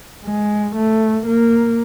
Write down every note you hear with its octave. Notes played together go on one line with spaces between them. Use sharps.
G#3
A3
A#3